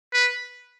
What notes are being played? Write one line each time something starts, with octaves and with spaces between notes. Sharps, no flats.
B4